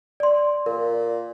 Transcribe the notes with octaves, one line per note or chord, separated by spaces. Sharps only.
D5 C6
A#2 A#4